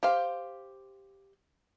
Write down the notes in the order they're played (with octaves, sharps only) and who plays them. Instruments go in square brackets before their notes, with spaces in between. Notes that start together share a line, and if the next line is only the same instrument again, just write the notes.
[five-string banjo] G4 C5 F5